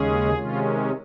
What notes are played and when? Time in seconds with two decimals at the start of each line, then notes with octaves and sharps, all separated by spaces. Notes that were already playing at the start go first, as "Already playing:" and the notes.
Already playing: D#2 C#3 G#3 C#4 G#4
0.33 C3 D#3 G#3 C#4 F4